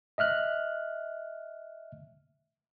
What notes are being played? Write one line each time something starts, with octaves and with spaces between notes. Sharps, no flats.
D#5 E5 F6 F#6